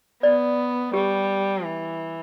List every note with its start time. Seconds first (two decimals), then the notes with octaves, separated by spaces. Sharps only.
0.23 B3 D5
0.94 G3 G4
1.65 E3